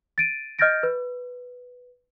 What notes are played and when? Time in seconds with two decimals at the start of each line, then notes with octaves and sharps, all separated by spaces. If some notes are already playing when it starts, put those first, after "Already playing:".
0.18 A6 D7 D#7
0.59 D#5 F6 G6 A6 A#6 D7
0.83 B4